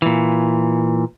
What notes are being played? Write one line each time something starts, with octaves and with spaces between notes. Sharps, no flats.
A#2 E3